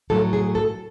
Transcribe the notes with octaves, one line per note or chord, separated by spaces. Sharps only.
A2 F#3 A4
G#4
A4